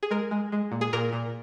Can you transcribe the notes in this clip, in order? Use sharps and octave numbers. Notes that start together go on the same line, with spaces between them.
G#4
G#3 A#4
G#3
G#3
A#2
G#4
A#2 A#4
A#2